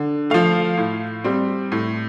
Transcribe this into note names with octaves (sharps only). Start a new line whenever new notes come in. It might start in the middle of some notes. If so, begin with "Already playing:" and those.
Already playing: D3
F3 A3 F5
A2
G3 C4
A2